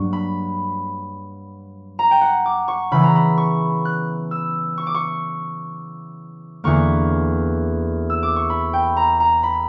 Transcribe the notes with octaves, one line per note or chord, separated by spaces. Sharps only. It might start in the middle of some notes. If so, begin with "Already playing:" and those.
Already playing: G2 F#3 A#3 C#6
B5
A#5
G5
F#5
D6
C#6
C#3 E3 B3 B5
A#5
B5
C#6
F#6
E6
C#6
D6
C#6
E2 D3 A#3 C#6
E6
D6
C#6
B5
G5
A#5
A#5
B5